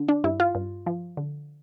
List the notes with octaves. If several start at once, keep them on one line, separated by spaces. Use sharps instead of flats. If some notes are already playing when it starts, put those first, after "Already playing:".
Already playing: D3
D4
G2 E4
F4
G2
F3
D3